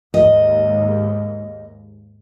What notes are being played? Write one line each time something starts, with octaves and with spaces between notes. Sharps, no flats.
D#2 G#2 D#5